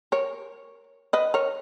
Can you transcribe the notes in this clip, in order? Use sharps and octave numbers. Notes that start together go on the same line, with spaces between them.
A#4 C#5
B4 D#5
A#4 C#5